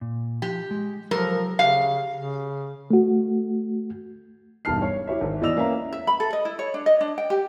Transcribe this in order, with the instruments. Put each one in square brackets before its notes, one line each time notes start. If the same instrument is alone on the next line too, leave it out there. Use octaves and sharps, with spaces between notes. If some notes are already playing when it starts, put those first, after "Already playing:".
[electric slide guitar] A#2
[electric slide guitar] F3 [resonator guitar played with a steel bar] G4
[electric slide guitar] G#3
[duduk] F3 [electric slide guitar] F#3 G4 A4 [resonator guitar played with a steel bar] A#4
[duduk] C#3 [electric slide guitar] G4 [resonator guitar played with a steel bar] F5
[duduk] C#3
[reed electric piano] A3 F#4
[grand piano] E1 G2 D#4 A5 F6 C7
C#5
E4 G4 C#5 E5
G#1
E2 E3 D5 D#5 E6 F7
A#3 C#4 B4 E5 A#5
[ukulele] E5
B5
A4
D#5
E4
C#5
D4
D#5
D4
G5
G4